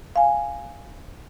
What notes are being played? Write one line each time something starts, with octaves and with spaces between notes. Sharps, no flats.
F5 G#5